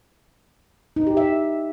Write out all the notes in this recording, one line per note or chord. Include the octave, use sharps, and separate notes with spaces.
D#4
G4
E5